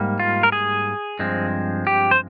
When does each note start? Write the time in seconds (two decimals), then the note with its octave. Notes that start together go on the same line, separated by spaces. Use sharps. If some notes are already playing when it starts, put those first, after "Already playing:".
Already playing: G#2 G3 A#3
0.20 F4
0.43 A#4
0.52 G#4
1.19 G2 F3 G#3 C4
1.87 G4
2.11 C5